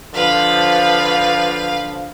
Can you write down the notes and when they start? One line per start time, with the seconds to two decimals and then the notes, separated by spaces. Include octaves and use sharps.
0.14 D3 F3 B4 F5